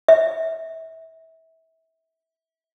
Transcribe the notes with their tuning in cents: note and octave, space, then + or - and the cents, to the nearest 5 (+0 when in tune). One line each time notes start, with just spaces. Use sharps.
E5 -25